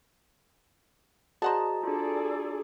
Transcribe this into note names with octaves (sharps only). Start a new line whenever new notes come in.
F#4 G#4 C5 D5 D#5 F#5 A5 A#5
D4 F4 G#4 A4 D5